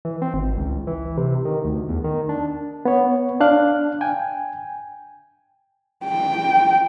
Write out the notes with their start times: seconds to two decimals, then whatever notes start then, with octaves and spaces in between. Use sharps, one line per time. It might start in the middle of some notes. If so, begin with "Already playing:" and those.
0.05 E3
0.22 C4
0.34 G#1
0.57 C#2
0.87 E3
1.17 C3
1.45 D#3
1.65 D2
1.89 E2
2.04 D#3
2.29 D4
2.85 B3 C#5
3.40 D4 F5 F#6
4.01 G5 G#5
6.05 G5